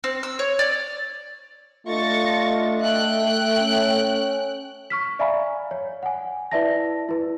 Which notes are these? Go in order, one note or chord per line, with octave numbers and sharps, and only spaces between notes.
C4
E6
C#5
D5
A3 D4 F4 D5 D#5 C#6 A6 A#6
E5 G5 F#6
C#4
C#6 F6 B6
D5 E5 F5 G#5 A#5 B5
C#5
F#5 G#5
E4 B4 D5 E5 A5 A#6
E4 B4